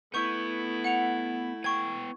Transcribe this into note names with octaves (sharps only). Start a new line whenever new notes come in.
A3 B3 E4 C#6 G6
F#5 C#7 F7
B3 G5 C#6 G#6